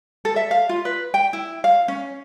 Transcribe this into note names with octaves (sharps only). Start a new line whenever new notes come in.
A4
E5
F5
F4
B4
G5
E4
F5
C#4